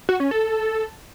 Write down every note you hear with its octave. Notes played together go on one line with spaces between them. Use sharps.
F#4
C#4
A4